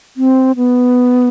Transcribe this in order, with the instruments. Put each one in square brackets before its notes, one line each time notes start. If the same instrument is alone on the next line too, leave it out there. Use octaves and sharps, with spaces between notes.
[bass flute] C4
B3